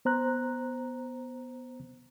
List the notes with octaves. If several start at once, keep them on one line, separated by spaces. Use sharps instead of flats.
B3 C5 A#5 F#6